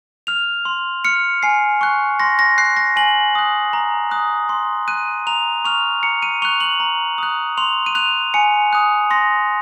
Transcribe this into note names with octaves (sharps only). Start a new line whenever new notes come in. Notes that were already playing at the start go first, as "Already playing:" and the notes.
F6 F7
C6
F6 C#7
G#5 C7
C#6 F#6
C6 A#6
A#6
F#6 C7
A#6
G#5 F#7
D#6 F#6
A#5
D#6 F#6
C6
F#6 D#7
A#5 F7
C#6 F6 F7
A#5 C#7
D#7
C#6 F#6 F7
F#7
A#5
D#6 F#6
C6 F7
D#7
F#6 F7
G#5 C#7
D#6 F#6
C6 A#6